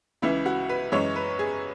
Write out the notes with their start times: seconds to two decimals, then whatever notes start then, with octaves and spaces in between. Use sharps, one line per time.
0.22 C#2 C#3 E3 E4
0.46 F#4
0.69 B4
0.92 F#2 E3 G#3 C#5
1.16 B4
1.39 G#4